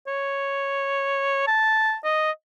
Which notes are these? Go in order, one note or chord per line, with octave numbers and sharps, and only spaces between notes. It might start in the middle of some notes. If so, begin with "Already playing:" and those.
C#5
A5
D#5